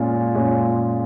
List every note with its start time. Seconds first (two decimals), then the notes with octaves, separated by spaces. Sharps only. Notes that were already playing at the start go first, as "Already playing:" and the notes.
Already playing: A#2 G#3 C#4 F4
0.35 A#2 G#3 C#4 F4 G#4